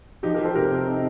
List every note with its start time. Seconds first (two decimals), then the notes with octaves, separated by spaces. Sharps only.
0.23 F3 D#4 G4
0.34 G4 A#4
0.39 F3
0.44 A4 C5
0.55 C3 G4 A#4
0.71 C4
0.86 C4 D#4